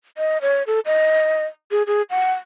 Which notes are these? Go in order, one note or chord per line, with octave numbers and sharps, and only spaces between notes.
D#5
C#5
A4
D#5
G#4
G#4
F#5